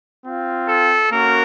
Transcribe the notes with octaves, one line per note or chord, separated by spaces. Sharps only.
C4 F4
A4
A#3 C#4 F#4 A#4